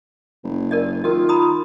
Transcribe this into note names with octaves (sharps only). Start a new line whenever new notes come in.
F#1
A#4 D5 D#5
D#3 F4 A#4 D#5
A#5 B5 D#6